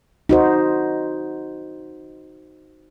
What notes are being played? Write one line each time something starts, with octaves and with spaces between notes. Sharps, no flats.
D#4 F#4 C5